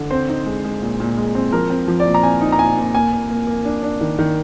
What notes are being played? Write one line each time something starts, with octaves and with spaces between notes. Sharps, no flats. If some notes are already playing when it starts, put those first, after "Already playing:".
Already playing: D3
C4 C5
D#4
G#3
G#3
A#2
A#2
G#3
C4
F3 A#4
C4
F3
D5
A#2
A#5
C4 G#5
D#4
A#5
A#2 G#5
A#2
A#3 G#5
A#3
A#3
A#3
D4
D4
D#3
D#3